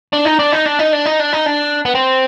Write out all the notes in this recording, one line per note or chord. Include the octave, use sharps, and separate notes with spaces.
D4
D#4
D4
D#4
D4
D#4
D4
D#4
D4
D#4
D4
B3
C4